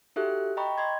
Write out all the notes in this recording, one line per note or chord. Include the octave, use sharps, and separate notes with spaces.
D#4 F#4 G4 A4 E5 F#6
D#5 G5 A#5 B5 C#6
D#5 C6 G#6